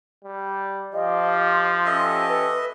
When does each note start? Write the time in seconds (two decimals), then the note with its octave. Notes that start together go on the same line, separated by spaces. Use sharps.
0.24 G3
0.93 F3 F4 G4 D#5
1.46 C6
1.86 C#4 G4 A4 D#5 E5
2.28 B4